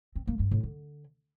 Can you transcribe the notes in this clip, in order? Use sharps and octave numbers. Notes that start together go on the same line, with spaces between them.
C4
A#3
G2
A2
D3